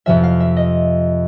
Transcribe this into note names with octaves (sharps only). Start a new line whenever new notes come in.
F2 C3 F3 E5
F5
E5
D#5